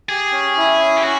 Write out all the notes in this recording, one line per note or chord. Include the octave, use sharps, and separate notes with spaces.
G4 G#4
C#4
E4
C#4
G4
C#4 F#4